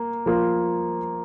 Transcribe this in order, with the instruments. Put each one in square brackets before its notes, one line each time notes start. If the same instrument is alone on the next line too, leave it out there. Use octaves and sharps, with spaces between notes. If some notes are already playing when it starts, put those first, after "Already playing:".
Already playing: [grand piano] A#3
F3 A#3 F4